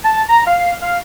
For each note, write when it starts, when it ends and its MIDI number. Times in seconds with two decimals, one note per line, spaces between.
0.04 0.23 81
0.29 0.44 82
0.46 0.73 77
0.82 0.98 77